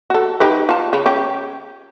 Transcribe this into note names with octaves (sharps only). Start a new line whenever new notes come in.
F#4 A4
D#4 G4 B4
F4 A5
C#3
C#4 G4